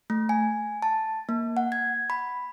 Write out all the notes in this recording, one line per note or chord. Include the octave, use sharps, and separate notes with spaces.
A3
G#5
A5
A#3
F#5
G#6
B5